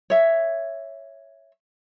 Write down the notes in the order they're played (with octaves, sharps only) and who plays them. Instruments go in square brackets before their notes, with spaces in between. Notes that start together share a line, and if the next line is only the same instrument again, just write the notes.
[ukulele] C#5 E5